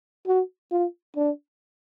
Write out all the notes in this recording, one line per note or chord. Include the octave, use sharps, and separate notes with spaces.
F#4
F4
D4